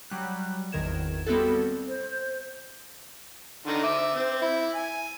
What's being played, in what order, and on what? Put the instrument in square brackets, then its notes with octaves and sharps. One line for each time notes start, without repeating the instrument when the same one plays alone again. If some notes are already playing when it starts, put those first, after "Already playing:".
[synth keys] F#3 G3 F#6
G#1 E2 D#3 A#4 G#6 E7
G3 B3 C4 E4 F#4 A4
[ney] C5
[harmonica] D3 D#3 D#4
E5 D6
C4
E4
G#5